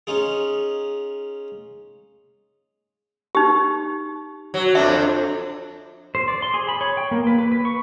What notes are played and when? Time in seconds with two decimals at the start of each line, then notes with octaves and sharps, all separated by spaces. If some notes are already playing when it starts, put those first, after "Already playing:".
0.07 C#4 D#4 F4 G#4
3.35 D#4 G4
4.54 F#3
4.75 F2 D4 E5
6.15 C5
6.28 D5
6.42 C6
6.54 G#4
6.69 B5
6.81 C#5
6.97 G5
7.11 A#3
7.27 B4
7.39 B4
7.52 B4
7.65 C#6